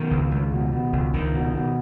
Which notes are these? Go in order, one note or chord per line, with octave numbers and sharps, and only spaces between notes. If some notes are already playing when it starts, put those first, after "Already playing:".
Already playing: B2 D#3
C#2
C#2
B2
B2
C#2
C#2 D#3
B2
B2